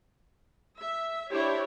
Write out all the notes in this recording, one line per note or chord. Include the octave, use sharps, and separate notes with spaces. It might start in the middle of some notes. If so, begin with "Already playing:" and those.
E5
D4 E4 G4 C5 C#5